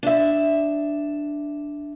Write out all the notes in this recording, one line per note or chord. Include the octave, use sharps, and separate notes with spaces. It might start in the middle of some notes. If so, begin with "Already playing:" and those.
D4 E5